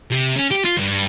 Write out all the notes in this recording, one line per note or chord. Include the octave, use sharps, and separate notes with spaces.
C3
C#4
G4
F4
G2